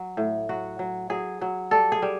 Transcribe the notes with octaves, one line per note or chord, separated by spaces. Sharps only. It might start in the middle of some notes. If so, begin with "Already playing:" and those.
Already playing: F#3
A2
F#3 F#4
F#3
F#3 G#4
F#3
G3 A4
G#4
G3